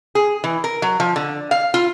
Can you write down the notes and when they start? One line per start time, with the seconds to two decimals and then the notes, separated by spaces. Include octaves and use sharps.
0.15 G#4
0.44 E3
0.64 A#4
0.82 F#3
1.00 F3
1.16 D3
1.51 F5
1.74 F4